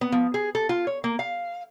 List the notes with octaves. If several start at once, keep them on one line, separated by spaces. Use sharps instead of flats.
B3
F3
G#4
A4
F4
C#5
A#3
F5